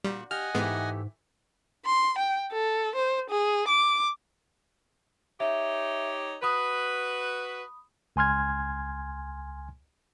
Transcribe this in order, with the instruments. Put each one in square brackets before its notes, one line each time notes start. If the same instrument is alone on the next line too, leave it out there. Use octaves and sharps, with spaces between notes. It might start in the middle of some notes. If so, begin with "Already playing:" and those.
[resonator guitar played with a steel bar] A#2 F#4 [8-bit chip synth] G3
[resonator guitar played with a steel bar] G4 [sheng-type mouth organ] D#5 F#5 G#5 [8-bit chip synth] F6
[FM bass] G#2 [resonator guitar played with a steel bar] E3 A3 G4 [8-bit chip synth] G#3 B3
[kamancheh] C6
G5
A4
C5
G#4
D6
[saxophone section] D#4 G4 C#5 [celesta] E5
[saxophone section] F#4 B4 [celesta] B5 D#6
[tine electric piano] C#2 G#5 C6 F6 G#6